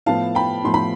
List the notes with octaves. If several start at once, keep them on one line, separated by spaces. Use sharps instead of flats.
A2 F3 B3 F5 A5
G5 B5
A2 F3 B3 C6
B5